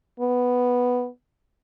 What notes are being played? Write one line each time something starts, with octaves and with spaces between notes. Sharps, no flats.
B3